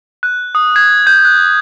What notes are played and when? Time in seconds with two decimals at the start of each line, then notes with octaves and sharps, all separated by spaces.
0.23 F#6
0.55 D#6
0.76 G#6
1.07 G6
1.25 F#6